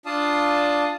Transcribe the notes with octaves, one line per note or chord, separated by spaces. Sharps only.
D4 F4 D5 F5 A5 D#6